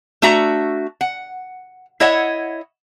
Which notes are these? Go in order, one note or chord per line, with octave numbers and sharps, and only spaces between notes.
A3 D4 F#4 E5 A#5
F#5
E4 C#5 D#5 E5 F#5